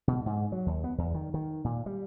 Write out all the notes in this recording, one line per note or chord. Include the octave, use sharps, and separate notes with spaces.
B2
G#2
F#3
D#2
B3
E2
D#3
D#3
A#2
G3